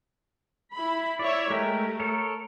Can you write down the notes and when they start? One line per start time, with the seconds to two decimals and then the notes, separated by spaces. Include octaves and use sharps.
0.74 E4 B5
1.19 E4 C#5 D5 E5
1.50 G#3 A3 G4 A#4
2.00 A4 A#4 C#5